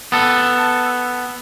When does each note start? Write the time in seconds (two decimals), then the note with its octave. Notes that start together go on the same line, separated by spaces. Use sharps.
0.12 B3 A4